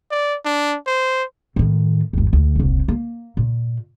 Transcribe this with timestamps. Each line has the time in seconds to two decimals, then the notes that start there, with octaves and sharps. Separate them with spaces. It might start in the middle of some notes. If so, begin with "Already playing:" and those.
0.11 D5
0.46 D4
0.87 C5
1.56 A2 D#3
2.13 G1 D#2
2.33 D2
2.55 D#1 C2
2.88 A#3
3.37 A#2